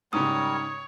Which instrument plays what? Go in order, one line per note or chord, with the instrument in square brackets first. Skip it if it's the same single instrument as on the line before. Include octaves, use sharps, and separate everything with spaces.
[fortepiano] G#2 C#3 [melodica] G3 A#4 [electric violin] C#5 [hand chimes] D#6